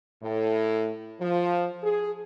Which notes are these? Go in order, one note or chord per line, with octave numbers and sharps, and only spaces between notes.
A2
F3
G#4